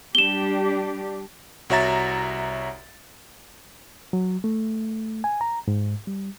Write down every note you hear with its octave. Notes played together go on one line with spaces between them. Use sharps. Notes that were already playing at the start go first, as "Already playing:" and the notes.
G3 D4 G4 E7 G7
C2 F#4 C#5 E5 A#5 A6
F#3
A3
G#5
A#5
G#2
G3